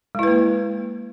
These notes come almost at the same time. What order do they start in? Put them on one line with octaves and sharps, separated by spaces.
G#3 E4 B4 A#3